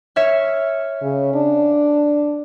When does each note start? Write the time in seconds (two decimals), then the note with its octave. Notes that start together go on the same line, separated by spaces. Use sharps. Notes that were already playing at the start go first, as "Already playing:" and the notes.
0.16 C#5 E5 F6
1.02 C#3
1.34 D4